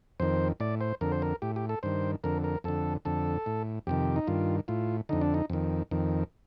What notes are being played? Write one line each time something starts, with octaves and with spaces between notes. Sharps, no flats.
F2 D#3 C5
A2 D5
C5
F2 D3 A#4
C5
A#4
A2 G4
G4
A4
G2 D#3 C5
F2 D3 A#4
A#4
F2 D3 A4
F2 D3 A4
A2
F2 C3 D#3 G4
D#4
G2 D#3 F4
A2 F4
F2 D3 D#4
D4
D#4
F2 D#3
F2 D#3